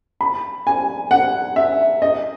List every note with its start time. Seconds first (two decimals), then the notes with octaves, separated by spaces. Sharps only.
0.21 B5
0.67 G#5
1.11 F#5
1.56 E5
2.02 D#5